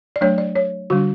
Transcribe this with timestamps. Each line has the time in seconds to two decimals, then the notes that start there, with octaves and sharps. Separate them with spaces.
0.16 D5
0.21 F#3 A3 D4 C#5
0.38 D5
0.55 C#5
0.90 D3 G3 D4 F#4